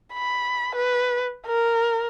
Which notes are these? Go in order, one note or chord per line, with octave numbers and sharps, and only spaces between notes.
B5
B4
A#4